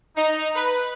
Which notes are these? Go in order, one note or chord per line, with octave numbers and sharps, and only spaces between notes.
D#4
B4